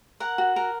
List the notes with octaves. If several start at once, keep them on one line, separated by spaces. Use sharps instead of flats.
A#4 F#5
F#4
A#4